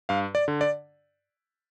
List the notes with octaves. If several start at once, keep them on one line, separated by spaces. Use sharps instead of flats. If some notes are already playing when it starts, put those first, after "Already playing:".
G2 F5
D5
D3
D5